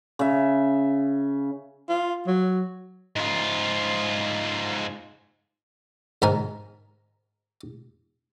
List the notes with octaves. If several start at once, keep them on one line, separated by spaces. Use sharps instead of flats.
C#3 E5
F4
F#3
G#2 F4
G#2 A#4 G#5